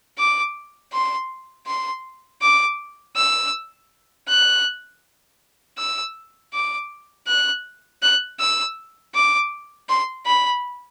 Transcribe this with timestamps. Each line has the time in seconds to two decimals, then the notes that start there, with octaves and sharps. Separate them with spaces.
0.19 D6
0.93 C6
1.67 C6
2.42 D6
3.16 E6
4.29 F#6
5.78 E6
6.53 D6
7.27 F#6
8.02 F#6
8.40 E6
9.15 D6
9.89 C6
10.26 B5